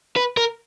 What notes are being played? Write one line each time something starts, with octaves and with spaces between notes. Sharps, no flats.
B4
A#4